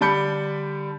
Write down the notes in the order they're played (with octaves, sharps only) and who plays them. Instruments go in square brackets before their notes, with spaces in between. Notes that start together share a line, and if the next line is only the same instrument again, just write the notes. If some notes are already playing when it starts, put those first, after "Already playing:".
[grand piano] D3 G3 D4 B5 G6 C#7